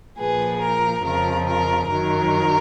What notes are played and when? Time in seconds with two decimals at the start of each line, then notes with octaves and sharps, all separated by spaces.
0.19 A#2 F3 G#4 B4
0.61 A#4
1.04 F2 C#3 F3 A#4
1.47 A#4
1.90 F#2 D#3 F#3 A#4